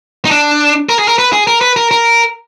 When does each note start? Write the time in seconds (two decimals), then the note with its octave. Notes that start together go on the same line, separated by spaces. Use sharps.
0.25 D#4
0.31 D4
0.89 A#4
0.99 G#4
1.08 A#4
1.19 B4
1.33 G#4
1.47 A#4
1.61 B4
1.76 A#4
1.91 A#4